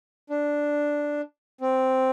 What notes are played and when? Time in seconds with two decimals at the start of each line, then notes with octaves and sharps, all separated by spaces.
0.30 D4
1.61 C4